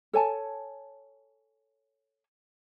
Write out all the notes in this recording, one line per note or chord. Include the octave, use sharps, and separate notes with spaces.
A4 C#5 G#5 A5